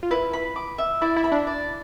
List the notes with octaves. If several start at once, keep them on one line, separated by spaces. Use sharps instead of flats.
F4
E4 B4
B5
D6
E5
E4 D5
E4
B5
D4
D5